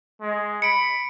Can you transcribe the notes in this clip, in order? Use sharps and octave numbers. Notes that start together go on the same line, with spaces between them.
G#3
B5 C#7 D7